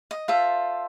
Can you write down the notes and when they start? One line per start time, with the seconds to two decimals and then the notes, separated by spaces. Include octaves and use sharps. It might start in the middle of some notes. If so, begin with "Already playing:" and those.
0.11 D#5
0.28 F4 A4 C5 E5